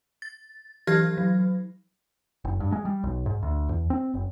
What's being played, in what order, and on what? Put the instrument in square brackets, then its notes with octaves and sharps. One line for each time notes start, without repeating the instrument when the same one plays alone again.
[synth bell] A6
E3 F#3 G4 F6 G#6 A#6
F#3
[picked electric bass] F#1
G2
G#3
G3
B1
G#2
D2
E2
C4
F#1